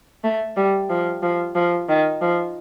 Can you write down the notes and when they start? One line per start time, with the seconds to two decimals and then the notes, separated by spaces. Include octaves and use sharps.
0.24 A3
0.56 G3
0.90 F3
1.23 F3
1.55 F3
1.89 D#3
2.21 F3